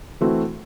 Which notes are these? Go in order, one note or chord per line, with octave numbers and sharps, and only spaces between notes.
E3 A3 C4 F#4